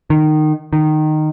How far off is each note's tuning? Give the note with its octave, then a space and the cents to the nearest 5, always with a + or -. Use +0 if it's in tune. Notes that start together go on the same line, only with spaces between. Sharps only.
D#3 -20
D#3 -15